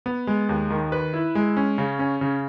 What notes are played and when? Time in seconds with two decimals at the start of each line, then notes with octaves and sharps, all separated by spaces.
0.06 B3
0.27 G#3
0.49 D#2
0.70 D#3
0.92 B4
1.14 E4
1.35 G#3
1.57 C#4
1.78 C#3
1.99 C#4
2.21 C#3